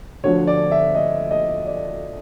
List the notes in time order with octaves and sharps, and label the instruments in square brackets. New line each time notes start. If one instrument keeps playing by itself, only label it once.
[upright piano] D2 D3 F3 C#5
D5
E5
D#5
D#5
D5